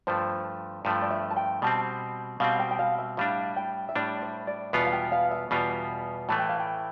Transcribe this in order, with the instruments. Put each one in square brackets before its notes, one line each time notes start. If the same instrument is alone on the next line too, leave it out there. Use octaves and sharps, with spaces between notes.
[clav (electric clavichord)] G2 F3 A3 [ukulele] C5
[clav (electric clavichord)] G2 F3 A3
[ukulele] D5
E5
A5
G5
[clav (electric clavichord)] B2 G3 C4 [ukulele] A5
[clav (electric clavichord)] B2 G3 C4 [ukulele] F5
[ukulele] G5
G5
F5
E5
[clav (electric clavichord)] A2 G3 D4 [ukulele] F5
[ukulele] G5
E5
[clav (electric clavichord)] A2 G3 D4 [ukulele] D5
[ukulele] C5
D5
[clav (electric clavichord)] E2 B2 G3 B3 F4
[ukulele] F5
G5
F5
E5
[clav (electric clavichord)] E2 B2 G3 B3 F4
[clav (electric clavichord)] A2 E3 A3 [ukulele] A5
[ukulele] G5
F5
G5